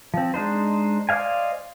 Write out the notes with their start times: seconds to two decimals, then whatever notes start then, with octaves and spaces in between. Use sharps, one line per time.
0.14 F3 C4
0.34 G#3 D4 D#4 C5
1.09 C5 D5 D#5 F5 G#5